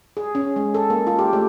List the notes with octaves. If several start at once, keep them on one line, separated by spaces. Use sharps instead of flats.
G#4
C#4
G#3
A4
A#3
F4
G4
A3